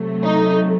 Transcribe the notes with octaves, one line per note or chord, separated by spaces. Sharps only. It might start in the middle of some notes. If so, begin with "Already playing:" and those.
Already playing: C3 F#3 A3
D#4